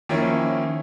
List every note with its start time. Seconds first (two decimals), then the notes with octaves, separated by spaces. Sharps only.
0.09 D#3 F3 A#3 C#4 E4